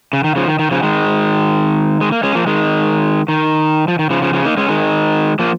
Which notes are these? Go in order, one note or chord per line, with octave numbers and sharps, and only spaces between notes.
C#3
D#3
C#3 F3
D#3
D#3
C#3 F3
D#3 G#3
G#3
A#3
G#3 C#4
F3 A#3
D#3 G#3
D#3
F3
D#3
C#3 F3
C#3 F3
C#3 F3
A#3 D#4
G#3 C#4
D#3 G#3
F3 A#3